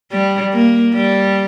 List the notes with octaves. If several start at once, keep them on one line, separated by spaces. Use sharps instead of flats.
G3
A#3
G3